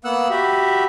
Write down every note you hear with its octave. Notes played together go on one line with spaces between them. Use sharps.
A#3 B3 F#5 E6 F#6
F#4 G4 E5 B5